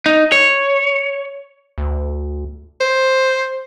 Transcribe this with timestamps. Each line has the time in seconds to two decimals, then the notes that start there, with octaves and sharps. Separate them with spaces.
0.06 D#4
0.32 C#5
1.78 D2
2.81 C5